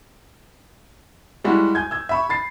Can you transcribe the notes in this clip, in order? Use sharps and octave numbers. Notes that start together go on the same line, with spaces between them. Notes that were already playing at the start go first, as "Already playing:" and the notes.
G3 G#3 E4 F#4
G#5 G6 G#6
E6 G#6
E5 B5 C#6
B5 A6 C7